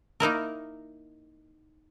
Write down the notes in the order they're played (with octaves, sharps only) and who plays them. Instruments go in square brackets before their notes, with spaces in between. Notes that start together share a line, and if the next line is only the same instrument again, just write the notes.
[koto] A#3 D#4 E4 A#4